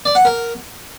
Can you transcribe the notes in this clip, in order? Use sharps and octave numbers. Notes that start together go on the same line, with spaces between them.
D5
F#5
A#4